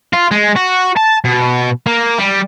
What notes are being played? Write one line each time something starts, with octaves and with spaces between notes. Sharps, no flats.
F4
G#3
F#4
A5
B2
A#3
G3